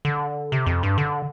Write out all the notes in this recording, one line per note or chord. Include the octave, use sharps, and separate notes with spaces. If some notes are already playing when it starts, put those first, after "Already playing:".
D3
C3
F2
G2
D3